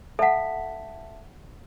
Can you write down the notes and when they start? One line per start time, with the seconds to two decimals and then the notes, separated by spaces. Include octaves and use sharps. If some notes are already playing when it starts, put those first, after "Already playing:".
0.19 A4 E5 F#5 A5 B6